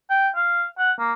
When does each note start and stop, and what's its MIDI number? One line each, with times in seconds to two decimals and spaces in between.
0.10 0.29 79
0.36 0.65 77
0.78 0.92 78
0.99 1.13 58